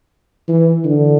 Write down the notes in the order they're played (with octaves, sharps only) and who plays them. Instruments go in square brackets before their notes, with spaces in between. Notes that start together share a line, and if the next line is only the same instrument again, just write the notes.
[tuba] E3
D3